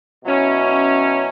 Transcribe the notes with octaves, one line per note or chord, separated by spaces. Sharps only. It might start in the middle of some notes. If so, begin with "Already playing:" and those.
B2 F#3 C#4 E4